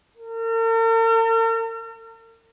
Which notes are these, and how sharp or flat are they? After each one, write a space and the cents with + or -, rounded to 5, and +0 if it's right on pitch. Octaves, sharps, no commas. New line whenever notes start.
A#4 -45